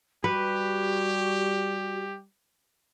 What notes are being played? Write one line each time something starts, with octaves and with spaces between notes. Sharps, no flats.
G3 F#4 G4 B4